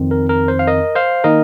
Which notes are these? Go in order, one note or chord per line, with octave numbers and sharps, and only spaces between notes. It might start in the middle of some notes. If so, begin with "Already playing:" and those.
Already playing: F2 D#3 C4
A#4
A#4
C5
F5
A#4 D#5
C5 F5
D#3 A#3 D#4 A#4 D#5